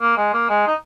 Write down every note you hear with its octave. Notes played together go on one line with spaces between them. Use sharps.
A#3
G#3
A#3
G#3
D#4